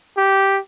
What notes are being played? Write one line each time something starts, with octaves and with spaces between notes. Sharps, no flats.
G4